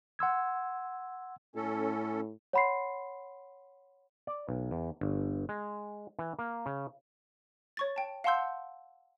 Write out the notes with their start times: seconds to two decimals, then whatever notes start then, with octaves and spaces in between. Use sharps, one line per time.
0.19 F#5 C6 E6 G#6
1.55 A2 C#4 A4
2.53 C#5 F#5 B5 C6 C7
4.27 D5
4.49 B1
4.71 E2
5.01 G1
5.49 G#3
6.19 E3
6.39 A#3
6.66 C#3
7.77 C#5 C#6 A6
7.96 G5 A5
8.24 F5 F#5 A5 C6 E6 G6